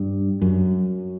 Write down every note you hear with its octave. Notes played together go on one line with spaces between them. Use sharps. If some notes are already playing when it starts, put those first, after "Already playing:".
Already playing: G2
F#2